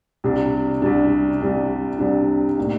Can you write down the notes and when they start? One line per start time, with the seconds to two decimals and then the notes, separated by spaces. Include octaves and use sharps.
0.24 C2 C3 G3 D4
0.82 C2 C3 G3 D4
1.41 C2 C3 G3 D4
1.99 C2 C3 G3 D4
2.58 A2 G3 A#3 D#4